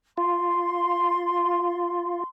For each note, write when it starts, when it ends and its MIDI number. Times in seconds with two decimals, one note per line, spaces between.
0.18 2.23 65
0.18 2.25 84